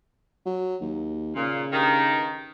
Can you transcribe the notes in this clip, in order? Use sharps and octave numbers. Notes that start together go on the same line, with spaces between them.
F#3
D#2
A#2 C#3
G2 D#3